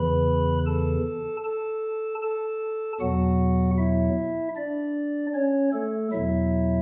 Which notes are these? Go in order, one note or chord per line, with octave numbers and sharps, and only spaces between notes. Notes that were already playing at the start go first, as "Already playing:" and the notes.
Already playing: E2 C#3 E3 B4 B5
A4 A5
A4 A5
A4 A5
E2 B2 F#3 F#4 F#5
E4 E5
D4 D5
C#4 C#5
A3 A4
E2 B2 F#3 E4 E5